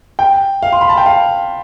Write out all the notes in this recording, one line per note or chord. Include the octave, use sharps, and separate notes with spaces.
G5
F5
C6
B5
A5
G5
F5